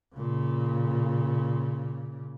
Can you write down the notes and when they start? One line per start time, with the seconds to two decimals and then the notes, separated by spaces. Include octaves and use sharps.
0.15 A#2 C#3